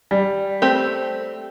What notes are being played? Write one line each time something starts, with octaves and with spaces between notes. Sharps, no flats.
G3
A3 C4 G4